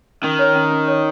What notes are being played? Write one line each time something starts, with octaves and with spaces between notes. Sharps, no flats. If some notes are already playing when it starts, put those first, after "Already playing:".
D#3 C#4
C#5
C#4
C#4
C#5